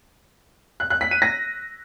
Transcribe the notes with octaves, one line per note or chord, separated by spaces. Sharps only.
F#6
F#6
B6
D#7
A#6